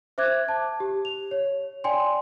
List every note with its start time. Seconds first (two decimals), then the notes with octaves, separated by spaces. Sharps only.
0.18 C5 E5 D6 F#6 G#6
0.48 A5
0.80 G4
1.05 F7
1.31 C#5
1.84 D5 G5 G#5 C6